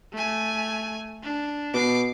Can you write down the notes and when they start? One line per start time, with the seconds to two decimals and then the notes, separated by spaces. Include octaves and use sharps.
0.13 A3 G#5
1.23 D4
1.74 B2 D6 C7